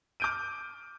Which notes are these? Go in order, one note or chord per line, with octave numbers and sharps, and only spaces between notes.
D6 F6 G6 D7 D#7